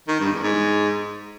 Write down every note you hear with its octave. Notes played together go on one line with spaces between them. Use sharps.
D#3
G2
E2
G#2